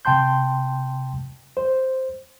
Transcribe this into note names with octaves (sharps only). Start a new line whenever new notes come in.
C3 G5 A5 C6 G6
C5